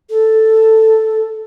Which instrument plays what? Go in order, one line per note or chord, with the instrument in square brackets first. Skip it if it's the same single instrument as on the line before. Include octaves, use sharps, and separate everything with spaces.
[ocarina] A4